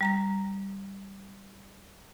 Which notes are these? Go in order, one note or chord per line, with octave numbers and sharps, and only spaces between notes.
G3 A#5 A#6